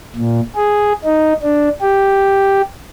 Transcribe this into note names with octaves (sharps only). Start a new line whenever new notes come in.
A#2
G#4
D#4
D4
G4